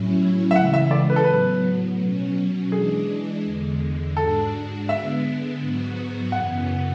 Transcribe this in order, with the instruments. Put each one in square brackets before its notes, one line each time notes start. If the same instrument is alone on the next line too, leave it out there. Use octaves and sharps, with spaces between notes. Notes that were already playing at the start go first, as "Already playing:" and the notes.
Already playing: [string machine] A2 F#3 C#4 E4
[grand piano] E5
[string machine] C#3 E3 G#3 [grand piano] F#5
[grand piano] E5
D5
B4
A4
[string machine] A2 F#3 B3 [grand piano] B4
[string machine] B2 F#3 C#4
[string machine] E3 G#3 D4 [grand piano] G#4
[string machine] E2 D3 G#3
[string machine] G#2 G#3 D4 F#4 [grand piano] A4
[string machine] D3 G#3 B3 D4 [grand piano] E5
[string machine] G#2 F#3 B3 F#4
[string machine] F#2 C#3 E3 B3 [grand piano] F#5